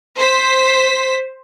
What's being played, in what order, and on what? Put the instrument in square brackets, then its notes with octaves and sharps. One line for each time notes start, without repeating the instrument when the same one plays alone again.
[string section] C5 B6